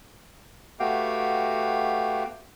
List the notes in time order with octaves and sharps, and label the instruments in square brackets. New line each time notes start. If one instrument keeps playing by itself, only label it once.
[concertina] A3 B3 F#4 G4 F5 G5